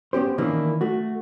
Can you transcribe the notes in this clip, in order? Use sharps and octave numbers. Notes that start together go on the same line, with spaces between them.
B3 C#4 G4 C5
D#3 E3 A#3 C#4 D4 E4
A3 F#4